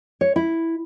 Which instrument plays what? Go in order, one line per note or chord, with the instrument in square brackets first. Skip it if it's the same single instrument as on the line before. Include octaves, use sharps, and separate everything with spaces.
[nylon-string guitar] C#5
E4